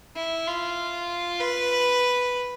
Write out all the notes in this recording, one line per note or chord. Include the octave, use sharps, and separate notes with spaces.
E4
F4
B4